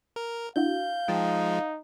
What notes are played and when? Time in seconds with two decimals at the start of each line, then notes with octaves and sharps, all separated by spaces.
0.16 A#4
0.56 D4 E4 F#4 F5 G6
1.08 F3 G#3 D#4 G5 A5